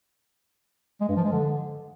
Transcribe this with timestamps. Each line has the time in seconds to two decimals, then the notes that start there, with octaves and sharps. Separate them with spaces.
1.01 G#3
1.09 G2
1.16 F3
1.24 G#3
1.32 D3